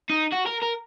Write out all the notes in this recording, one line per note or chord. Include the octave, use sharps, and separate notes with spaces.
D#4
F#4
A#4
A#4